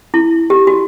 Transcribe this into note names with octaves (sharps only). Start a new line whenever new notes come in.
E4
G4
F#4